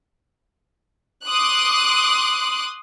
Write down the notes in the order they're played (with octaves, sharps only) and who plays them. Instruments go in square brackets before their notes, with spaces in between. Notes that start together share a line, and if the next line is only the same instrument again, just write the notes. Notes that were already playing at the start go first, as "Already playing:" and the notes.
[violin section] C6 D6 D#6 F#6